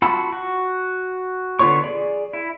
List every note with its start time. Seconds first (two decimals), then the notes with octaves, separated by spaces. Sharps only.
0.02 F4 F#4 A5 B5 E6
0.33 F#4
1.59 D3 B3 F4 C#5 C#6
1.84 G#4 D5
2.33 E4